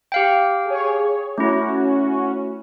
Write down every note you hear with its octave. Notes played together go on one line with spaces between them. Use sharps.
G4 F5 G5
G#4 C#5
A3 C#4 E4 F#4